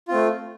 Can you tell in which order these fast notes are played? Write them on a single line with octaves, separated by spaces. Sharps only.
F4 C4 A3